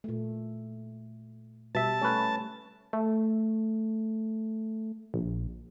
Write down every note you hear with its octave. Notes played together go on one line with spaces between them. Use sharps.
A#2 A3
B2 G3 E5 A5
A3 C#4 B4
A3
A#1